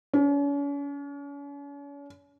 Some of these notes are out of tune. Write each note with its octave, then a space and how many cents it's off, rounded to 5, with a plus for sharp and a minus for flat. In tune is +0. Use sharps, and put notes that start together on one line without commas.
C#4 +40